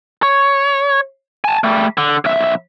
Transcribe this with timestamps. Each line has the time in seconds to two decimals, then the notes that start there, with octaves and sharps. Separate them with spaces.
0.23 C#5
1.44 G#5 A5
1.64 G3 A3
1.97 D3
2.25 B1 E5